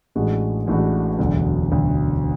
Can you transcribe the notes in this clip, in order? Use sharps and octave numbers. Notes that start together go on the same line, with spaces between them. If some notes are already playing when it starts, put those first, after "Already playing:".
A1 A2 G#3 D4 F#4
A1 A2 G#3 D4 F#4
E1 D2 D3 F#3
E1 D2 D3 F#3